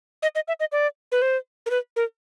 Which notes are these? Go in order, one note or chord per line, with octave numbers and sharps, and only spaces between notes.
D#5
D#5
E5
D#5
D5
B4
C5
A#4
B4
A#4